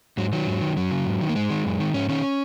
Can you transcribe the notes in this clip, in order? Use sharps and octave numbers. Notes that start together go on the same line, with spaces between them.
G#2 F#3
D#3 F#3
G#2
D#3
F#2 F#3
C#3
G#2
D#3
A#3
G#2 G#3
D#3
F#2
D#3
G#2 C#4
D#3 C#4